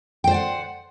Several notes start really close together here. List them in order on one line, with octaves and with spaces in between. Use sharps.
G5 C5 D5 F#5